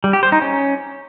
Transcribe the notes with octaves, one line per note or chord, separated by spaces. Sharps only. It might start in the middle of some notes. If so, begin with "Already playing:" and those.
G3
G4
C5
D#4
C#4